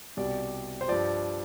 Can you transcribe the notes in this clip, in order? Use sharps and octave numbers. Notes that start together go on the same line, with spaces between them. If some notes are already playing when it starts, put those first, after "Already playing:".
C2 B2 G3 D5
C5
G2 F3 D5